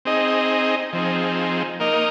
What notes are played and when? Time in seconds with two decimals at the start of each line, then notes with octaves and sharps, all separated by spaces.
0.05 C4 D#4 G#4 D#5
0.93 F3 C4 D#4 G#4
1.80 A#3 D#4 A#4 D#5